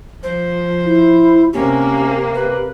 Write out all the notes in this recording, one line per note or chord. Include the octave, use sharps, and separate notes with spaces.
F3 C5
E4
C3 A#3 C#4 G4
B4